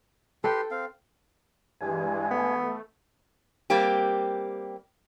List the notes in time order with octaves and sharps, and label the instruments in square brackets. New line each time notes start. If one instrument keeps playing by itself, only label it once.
[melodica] G4 B4 C6 [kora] A4 G5
[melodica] C4 F5
[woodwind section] G2 [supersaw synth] E3 G#3 [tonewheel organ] G#5
[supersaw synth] A3 [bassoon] B3
[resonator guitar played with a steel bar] G3 A#3 C4 G4